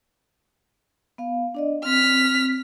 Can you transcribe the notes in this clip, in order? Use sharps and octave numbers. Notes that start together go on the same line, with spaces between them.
B3 F5
D4 D5 D#5
C4 F6 B6